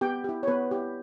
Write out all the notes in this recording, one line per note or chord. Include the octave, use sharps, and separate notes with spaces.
B3 G4 G5
E4 G4
C#5
B3 B4
E4 G4